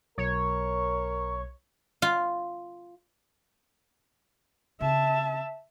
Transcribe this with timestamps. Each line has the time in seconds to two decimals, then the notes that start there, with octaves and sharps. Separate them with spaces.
0.18 B1 A#4 C#5
2.02 F4
4.81 C#3 C4 E5 A5